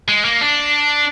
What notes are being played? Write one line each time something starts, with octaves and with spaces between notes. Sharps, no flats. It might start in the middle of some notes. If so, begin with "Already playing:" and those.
G#3
A#3
D4